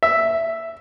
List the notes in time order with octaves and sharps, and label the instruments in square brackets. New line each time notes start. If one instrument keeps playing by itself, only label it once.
[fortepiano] E5